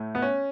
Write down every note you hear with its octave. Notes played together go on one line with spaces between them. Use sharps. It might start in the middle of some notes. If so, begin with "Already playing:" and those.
Already playing: A2 A3
B3
C#4